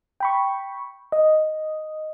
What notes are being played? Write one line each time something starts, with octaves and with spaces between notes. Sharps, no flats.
G5 B5 C#6
D#5